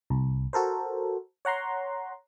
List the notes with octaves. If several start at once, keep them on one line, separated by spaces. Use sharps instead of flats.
C2
F#4 A4 A#4 C5
C#5 F#5 A#5 C6